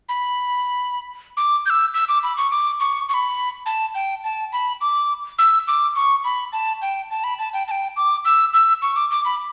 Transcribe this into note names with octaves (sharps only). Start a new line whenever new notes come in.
B5
D6
G6
E6
E6
D6
B5
C#6
D6
C#6
C#6
B5
A5
G5
A5
B5
D6
E6
D6
C#6
B5
A5
G5
A5
B5
A5
G5
A5
G5
D6
E6
E6
C#6
D6
D6
B5